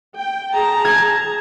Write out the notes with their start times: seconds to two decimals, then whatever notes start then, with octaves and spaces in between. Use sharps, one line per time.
0.16 G5
0.53 G#4 A5 A#5
0.85 G#6